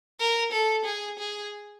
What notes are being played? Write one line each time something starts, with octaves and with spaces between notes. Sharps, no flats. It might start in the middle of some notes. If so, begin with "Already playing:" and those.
A#4
A4
G#4
G#4